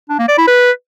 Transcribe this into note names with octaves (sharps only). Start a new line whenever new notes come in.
D4
A#3
D5
E4
B4